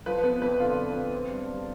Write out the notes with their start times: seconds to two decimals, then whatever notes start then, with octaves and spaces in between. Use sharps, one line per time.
0.06 F3 B4
0.24 B3 B4
0.41 F2 B4
0.60 D3 F4
0.77 F3
0.95 B3
1.13 C4
1.30 G2
1.49 G2